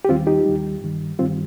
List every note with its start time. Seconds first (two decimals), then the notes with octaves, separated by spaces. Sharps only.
0.05 G4
0.09 D#2 D#3 G3 C4 F4
0.27 D#4 G4
0.46 D#2 D#3 G3
0.82 G2 D#3 G3
1.19 G2 D#3 G3 C4 F4